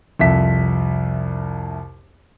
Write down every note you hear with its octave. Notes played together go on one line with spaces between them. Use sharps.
C2 F2 E5 B6